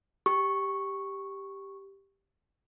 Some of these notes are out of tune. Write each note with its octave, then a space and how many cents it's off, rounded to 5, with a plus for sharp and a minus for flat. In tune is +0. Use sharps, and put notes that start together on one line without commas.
G4 +0 C#6 -5